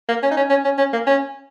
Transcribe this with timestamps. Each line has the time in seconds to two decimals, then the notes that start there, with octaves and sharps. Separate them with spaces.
0.08 A#3
0.22 C#4
0.31 D#4
0.37 C#4
0.50 C#4
0.64 C#4
0.78 C#4
0.93 A#3
1.06 C#4